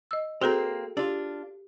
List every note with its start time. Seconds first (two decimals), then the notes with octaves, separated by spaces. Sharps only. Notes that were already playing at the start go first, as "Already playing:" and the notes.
0.11 D#5 E6
0.41 A#3 C4 F#4 G#4 A4
0.97 D4 F4 G4